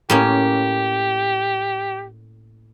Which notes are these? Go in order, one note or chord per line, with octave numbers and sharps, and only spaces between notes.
A2 A#3 C#4 G4